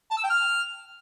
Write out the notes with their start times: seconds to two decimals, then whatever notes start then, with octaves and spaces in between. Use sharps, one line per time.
0.11 A5
0.17 E6
0.23 G5
0.30 F6